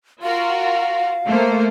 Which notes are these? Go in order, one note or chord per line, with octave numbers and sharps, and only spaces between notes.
F4 F#4 A#4 F5
A3 A#3 C5